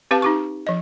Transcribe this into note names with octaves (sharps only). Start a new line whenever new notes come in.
C4 G4 B4 F5 A5
D#4 G4 C#6
F3 D#5